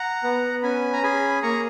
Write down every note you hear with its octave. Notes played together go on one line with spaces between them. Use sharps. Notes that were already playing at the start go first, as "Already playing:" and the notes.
Already playing: F#5 A#5
B3
C#4 G#5 B5
A#5
G#4 G#5 B5
A#3 A#5 C#6